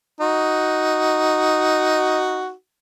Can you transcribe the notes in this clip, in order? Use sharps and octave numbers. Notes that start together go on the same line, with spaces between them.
D#4 F#4